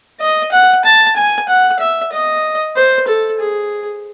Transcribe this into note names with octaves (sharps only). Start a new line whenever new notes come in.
D#5
F#5
A5
G#5
F#5
E5
D#5
C5
A4
G#4